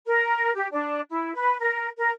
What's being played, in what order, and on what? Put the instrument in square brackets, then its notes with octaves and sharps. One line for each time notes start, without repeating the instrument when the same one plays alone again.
[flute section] A#4
G4
D4
E4
B4
A#4
A#4